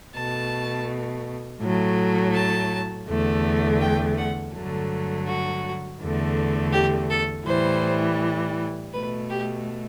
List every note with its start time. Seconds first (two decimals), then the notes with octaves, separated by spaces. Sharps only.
0.14 B2 A3 A5
1.60 A2 F#3 A3
2.34 A5
3.07 E2 D3 A3
3.80 G5
4.17 F#5
4.54 G2 D3 F#3 A3
5.27 F#4
6.01 E2 D3 A3
6.73 G4
7.10 A4
7.46 A2 E3 G3 C5
8.93 B2 A3 B4
9.30 G4